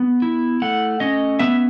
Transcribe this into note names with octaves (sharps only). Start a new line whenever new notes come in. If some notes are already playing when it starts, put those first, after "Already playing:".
Already playing: B3
E4
A3 F#5
C#4 D#5
B3 E5